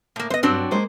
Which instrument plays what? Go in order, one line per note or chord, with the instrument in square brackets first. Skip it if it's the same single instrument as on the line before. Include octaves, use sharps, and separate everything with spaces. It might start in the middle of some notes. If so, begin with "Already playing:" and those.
[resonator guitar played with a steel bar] A2 A#3
[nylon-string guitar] B3 [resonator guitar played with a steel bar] C5 D#5
[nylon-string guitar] E2 G2 [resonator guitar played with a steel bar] F#3 C4 D4
[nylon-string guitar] G#3 A#3 C5